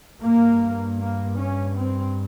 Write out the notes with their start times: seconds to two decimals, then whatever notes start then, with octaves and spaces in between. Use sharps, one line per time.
0.20 G2 A#3
0.98 A#3
1.38 C#4
1.76 C4